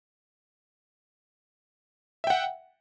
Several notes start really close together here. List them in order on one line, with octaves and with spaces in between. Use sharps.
E5 G5 F#5